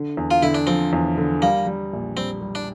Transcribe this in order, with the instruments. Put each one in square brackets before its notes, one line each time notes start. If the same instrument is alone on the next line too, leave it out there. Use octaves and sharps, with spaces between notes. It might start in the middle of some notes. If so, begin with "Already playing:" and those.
Already playing: [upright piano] D3
E2
[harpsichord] F4
[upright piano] D3 [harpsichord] E4
[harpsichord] D4
[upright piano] F3 [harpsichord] C4
[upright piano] E2
D3
[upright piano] G3 [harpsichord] A#3
[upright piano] G3
A#1
[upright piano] G3 [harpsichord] C4
[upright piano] G3
[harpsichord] D4